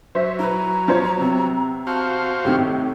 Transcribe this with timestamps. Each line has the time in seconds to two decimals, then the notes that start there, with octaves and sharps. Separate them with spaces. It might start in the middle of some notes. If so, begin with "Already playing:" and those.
0.15 F#3 C5 E5
0.39 E4 B4 A#5
0.88 F3 C5 C#5
1.18 C3 B3
1.87 F#4 C5 F5 A5
2.45 A2 C3 D#3 G4